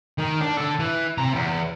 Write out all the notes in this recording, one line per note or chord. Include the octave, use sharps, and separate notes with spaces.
D#3
D4
D3 A4
E3
C3 A#5
E2